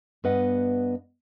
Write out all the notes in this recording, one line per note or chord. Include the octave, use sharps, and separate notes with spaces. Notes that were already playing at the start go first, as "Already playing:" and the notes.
G2 B3 B4 D#5 F#5